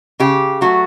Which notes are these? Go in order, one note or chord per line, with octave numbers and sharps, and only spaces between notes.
C#3 G4
F#3 A3 F#4